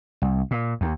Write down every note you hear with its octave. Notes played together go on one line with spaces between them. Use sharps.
C2
A#2
D#2